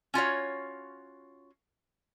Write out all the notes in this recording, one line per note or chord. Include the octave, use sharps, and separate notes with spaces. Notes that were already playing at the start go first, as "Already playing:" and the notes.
C#4 F4 F#4 C#5